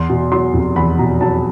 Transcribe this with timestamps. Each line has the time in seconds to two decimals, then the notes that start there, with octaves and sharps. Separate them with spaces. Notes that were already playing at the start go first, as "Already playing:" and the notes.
Already playing: E2 C6
0.09 B2
0.32 F#3 C6
0.54 F1
0.76 E2 B5
0.98 B2 A#5
1.21 F#3 A5